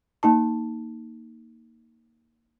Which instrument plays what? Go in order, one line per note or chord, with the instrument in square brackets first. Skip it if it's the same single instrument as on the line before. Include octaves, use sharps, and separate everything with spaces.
[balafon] A#3 D#4 A5